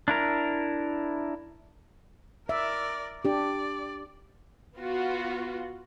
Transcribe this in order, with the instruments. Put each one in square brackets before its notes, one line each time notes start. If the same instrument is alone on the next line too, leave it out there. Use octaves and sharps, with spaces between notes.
[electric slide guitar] D4 E4 A#4
[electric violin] A#4 D5 [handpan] E5
[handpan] D4 G4 [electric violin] D5
[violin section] B3 F4 F#4